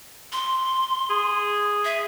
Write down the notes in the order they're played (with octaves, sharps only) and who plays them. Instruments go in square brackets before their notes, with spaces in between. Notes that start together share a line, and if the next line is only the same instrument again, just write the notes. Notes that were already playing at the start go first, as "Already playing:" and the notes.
[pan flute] C6
[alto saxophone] G#4
[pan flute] E5